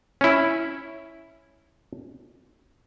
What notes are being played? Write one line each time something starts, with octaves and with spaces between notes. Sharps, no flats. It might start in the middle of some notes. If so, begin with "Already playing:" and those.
C#4 E4